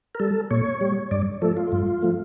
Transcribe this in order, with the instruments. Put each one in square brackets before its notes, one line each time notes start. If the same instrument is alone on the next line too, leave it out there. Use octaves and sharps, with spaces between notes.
[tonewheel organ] A#4
G3 A4
A#2 C#5
G3
G2 D5
F3 A3 A4
F4
G2
F3 A3